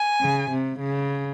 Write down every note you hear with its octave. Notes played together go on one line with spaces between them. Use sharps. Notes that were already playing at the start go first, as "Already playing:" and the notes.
Already playing: G#5
C#3
C3
C#3